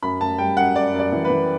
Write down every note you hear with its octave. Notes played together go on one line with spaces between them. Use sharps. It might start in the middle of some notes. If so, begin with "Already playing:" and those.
F#2 B5
F#2 A5
G3 G5
F#2 F#5
F#2 D5
F#2
D5
E3
B4
E3